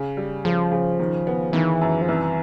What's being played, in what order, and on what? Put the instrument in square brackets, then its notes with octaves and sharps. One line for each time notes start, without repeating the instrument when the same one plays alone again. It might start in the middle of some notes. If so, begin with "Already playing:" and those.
Already playing: [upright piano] C#3
G3
[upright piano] C#3 [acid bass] F3
[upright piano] C#3
D#3
B3
[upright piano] D#3 [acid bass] E3
[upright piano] F#2
[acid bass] F3
[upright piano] C2 [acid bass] E3